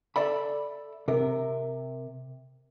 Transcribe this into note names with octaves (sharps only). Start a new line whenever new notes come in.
A4 D5 E5 B5
C3 A#4